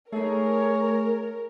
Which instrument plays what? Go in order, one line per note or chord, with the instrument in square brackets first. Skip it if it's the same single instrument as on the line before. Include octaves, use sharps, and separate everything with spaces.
[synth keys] A3 [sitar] D#4 G#4 [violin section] A#4 [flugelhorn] C#5